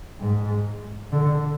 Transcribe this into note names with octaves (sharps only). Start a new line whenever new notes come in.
G#2
D3